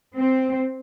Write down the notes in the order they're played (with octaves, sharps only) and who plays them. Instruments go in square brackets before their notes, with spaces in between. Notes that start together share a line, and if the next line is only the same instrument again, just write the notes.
[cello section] C4